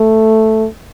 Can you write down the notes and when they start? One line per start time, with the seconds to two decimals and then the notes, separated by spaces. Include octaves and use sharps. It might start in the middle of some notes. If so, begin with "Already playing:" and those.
Already playing: A3